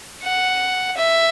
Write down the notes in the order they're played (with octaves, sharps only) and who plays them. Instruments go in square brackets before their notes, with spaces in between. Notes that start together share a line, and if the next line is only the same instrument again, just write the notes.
[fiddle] F#5
E5